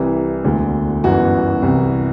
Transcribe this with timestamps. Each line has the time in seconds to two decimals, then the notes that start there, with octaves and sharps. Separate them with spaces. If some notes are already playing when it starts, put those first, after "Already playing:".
Already playing: C2 C3 E3
0.45 E1 D2 D3
1.04 G1 F#2 E3 F#4
1.62 C2 C3 E3